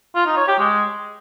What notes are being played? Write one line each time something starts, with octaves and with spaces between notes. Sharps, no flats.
F4
D#4
C#5
G4
G#3